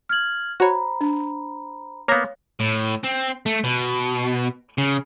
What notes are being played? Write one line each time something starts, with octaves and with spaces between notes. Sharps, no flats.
F6 G#6 F#7
F#4 C5 C#5 A#5 B5
D4
A#3 B3 C#5 F5 A#5 G#6 A#6
A2
C4
A3
B2
C#3